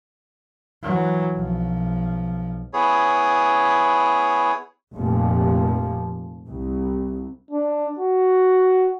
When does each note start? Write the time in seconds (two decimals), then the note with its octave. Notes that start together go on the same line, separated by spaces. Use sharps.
0.83 E3 F#3
1.35 B1 F3
2.73 B3 E4 G#4 C#5
4.94 F1 A#2 F3
6.49 C2
7.51 D4
7.99 F#4